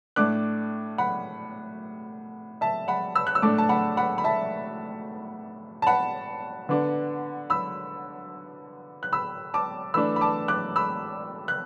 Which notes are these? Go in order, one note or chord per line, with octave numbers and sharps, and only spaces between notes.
A2 A3 D4 D6 F#6
F#5 B5
E5 A5
F#5 B5
B5 E6
F#6
E6
A2 A3 D4 A5 D6
A5
F#5 B5
F#5 B5
B5
E5 A5
A5
F#5 B5
D3 B3 D4
B5 E6
F#6
B5 E6
A5 D6
E3 A3 D4 B5 E6
B5
A5 D6
D6 F#6
B5 E6
F#6